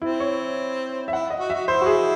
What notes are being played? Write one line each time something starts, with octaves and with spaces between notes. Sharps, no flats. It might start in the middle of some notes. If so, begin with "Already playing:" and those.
C4 E4
C#5
E5
E4 F#5
D#5
F#4
F#4 E5
E4 C5
F#4
G#4